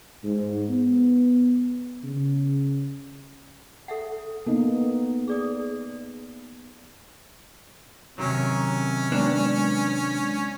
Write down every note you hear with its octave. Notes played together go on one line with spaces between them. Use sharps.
G#2
B3
C#3
A4 E5 F#5
A#3 B3 D#4 A4
G#4 D5 D#6
C3 D#3 F#3 C#4
G#3 B3 D4